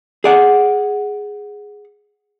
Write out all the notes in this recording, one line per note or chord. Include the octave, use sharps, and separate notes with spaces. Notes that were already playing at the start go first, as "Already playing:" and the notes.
G#4 D5 F#5